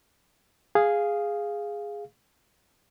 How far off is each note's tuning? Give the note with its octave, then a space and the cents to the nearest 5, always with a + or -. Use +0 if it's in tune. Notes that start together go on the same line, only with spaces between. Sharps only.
G#4 -5 F5 +0